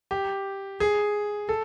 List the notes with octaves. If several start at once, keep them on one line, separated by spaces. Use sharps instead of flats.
G4
G#4
A4